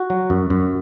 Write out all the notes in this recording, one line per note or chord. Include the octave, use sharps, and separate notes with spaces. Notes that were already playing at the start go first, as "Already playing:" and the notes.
Already playing: F#4
F#3
F#2
F#2